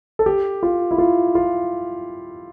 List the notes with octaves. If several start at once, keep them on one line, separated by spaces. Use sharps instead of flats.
A4
G4
F4
E4
F4
F4